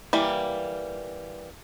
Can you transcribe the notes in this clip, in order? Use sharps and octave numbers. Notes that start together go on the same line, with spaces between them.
E3 G3 A#3